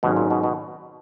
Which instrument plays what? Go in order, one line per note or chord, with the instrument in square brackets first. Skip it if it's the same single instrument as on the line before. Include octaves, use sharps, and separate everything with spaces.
[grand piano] G#1 G#2 F#3 C#4 G#4 [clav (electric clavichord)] B2
[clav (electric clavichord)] A#2
B2
B2